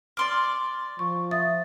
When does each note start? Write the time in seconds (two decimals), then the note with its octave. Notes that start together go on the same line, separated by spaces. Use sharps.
0.17 D5 C6 D6 F6
0.99 F3 C#6
1.31 E5 D#6 A6